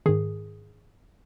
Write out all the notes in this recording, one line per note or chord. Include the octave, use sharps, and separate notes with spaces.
G#2 D#3 G#4